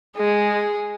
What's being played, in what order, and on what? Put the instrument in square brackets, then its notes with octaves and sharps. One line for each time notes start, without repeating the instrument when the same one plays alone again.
[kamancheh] G#3 [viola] G#4